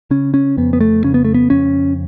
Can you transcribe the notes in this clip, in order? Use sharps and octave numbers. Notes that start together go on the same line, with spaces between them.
C#3 C#4
C#4
F2 B3
B3
A3
C#3 C#4
B3
A3
B3
F2 C#4